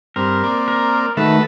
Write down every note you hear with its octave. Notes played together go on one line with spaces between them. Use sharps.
G2 C4 A#4
A#3 C4 D5
A#4
D#3 A3 F#4 A4 B4